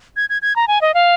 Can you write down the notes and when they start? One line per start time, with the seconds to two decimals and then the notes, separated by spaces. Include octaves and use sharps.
0.16 G#6
0.30 G#6
0.42 G#6
0.56 A#5
0.68 G#5
0.81 D#5
0.94 F5